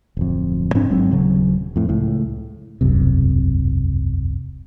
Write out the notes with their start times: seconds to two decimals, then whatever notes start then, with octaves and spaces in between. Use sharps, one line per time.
0.17 D1 F2
0.75 G#2 C4 D4
0.90 G1 G#2 F#3 C4
1.11 D#1 C#3 F#3
1.76 F2 A2
1.89 C#2 A2
2.81 E1 C2 F#2 C3